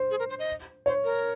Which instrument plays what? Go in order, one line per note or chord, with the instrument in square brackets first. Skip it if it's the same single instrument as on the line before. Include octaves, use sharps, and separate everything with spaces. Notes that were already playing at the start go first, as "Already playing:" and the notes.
Already playing: [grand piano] C5
[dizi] G#4
A#4
C5
D#5
[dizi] C5 [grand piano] C#5
[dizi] A#4